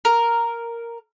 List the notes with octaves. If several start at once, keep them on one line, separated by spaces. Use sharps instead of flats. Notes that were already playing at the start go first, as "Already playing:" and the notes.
A#4